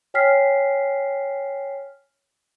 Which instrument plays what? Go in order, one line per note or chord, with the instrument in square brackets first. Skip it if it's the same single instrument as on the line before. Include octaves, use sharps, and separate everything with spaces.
[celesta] C#5 G5 G#5 F6 B6 C7